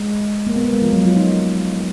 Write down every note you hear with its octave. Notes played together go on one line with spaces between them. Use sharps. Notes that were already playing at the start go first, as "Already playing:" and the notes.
Already playing: G#3
A#3
B3
A#3
G#3
F3
F#3
F4
D#4